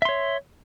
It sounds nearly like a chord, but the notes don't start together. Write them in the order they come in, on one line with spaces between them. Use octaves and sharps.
E5 C6 C#5